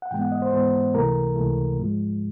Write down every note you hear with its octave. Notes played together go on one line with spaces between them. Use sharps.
F#5
G#2 E3 G#3 B3 G5
F#5
D#5
C5
G#2 E3 G#3 B3 C5
C#2 C3 E3 A3 A#4
C#2 C3 E3 A3
G#2 F3 G#3